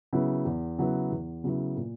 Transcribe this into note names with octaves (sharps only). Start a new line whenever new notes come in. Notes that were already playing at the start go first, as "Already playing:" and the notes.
C#3 F#3 B3 E4
E2
C#3 F#3 B3 E4
E2
C#3 F#3 B3 E4
A#2